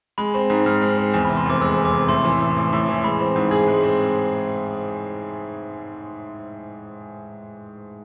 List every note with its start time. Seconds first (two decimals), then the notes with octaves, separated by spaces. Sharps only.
0.18 G#3 B5
0.34 C4
0.50 G#2
0.66 G#2 F6
0.81 G#3
0.98 C4
1.14 E2
1.25 C3 B5
1.37 C6
1.46 F1 D6
1.61 G#3 E6
1.77 E2
1.85 D6
1.93 C3
2.09 A2 C6
2.25 E3
2.40 A1
2.57 A1
2.73 A2
2.88 E3
3.03 G#3 B5
3.20 C4
3.36 G#2
3.51 G#4
3.68 G#3
3.83 C4